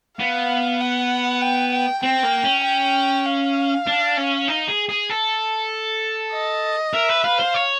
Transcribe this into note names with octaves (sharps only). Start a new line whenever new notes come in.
B3 F5
F#5
G5
G5
C4 G5
A#3
C#4
G5
F5
D4
C#4
D#4
G#4
G#4
A4
D#5
A#4 E5
B4
B4 F5
C5
C#5